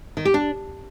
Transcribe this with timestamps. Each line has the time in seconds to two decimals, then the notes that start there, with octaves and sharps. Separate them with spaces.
0.17 D#3
0.25 G4
0.34 D4